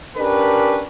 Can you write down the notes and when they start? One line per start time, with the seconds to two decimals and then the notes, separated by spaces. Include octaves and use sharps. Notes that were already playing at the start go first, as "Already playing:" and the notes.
0.17 C#4 D4 G4 A#4 B4